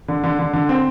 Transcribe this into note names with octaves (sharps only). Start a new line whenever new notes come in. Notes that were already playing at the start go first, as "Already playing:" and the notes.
D3
D3
D3
D3
C4